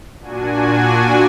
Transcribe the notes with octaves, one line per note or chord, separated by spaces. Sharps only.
A#2 D4 F#4 G#5